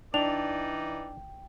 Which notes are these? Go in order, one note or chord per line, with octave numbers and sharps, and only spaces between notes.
E3 D4 D#4 D5 G5 F7